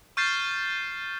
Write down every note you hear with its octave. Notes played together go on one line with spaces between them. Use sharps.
C#6 F6 G6 A6 C7 E7